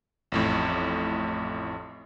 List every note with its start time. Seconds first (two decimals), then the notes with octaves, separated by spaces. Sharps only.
0.32 A1 F2 A2